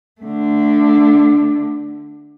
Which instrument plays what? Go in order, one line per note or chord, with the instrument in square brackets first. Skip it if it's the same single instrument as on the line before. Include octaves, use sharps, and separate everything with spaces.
[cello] D3 A3